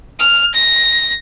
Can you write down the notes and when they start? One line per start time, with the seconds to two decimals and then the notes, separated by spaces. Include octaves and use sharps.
0.19 F6
0.54 A#6